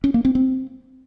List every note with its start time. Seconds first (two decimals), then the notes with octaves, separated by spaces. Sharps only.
0.04 C#4
0.14 A#3
0.25 C4
0.35 C4